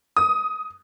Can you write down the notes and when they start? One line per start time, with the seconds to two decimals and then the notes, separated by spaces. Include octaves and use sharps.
0.17 D#6